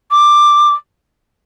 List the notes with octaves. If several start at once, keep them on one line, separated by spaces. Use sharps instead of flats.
D6